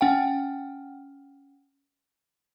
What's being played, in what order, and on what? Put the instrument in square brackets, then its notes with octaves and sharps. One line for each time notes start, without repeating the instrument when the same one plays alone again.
[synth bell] C#4 F#5 G5